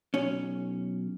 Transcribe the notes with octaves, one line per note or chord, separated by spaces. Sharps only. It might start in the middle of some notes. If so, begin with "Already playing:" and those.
B1 C#4